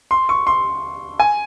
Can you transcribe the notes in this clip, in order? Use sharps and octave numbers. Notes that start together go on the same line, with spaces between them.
C6
C#6
C6
G#5